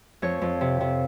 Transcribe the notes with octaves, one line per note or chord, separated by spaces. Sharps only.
F2 C#5
F2
C3
C3